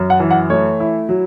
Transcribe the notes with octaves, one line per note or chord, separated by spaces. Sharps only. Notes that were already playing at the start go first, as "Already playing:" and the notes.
Already playing: F#2
F#5
E3
F#5
A3 C#5
E4
F#3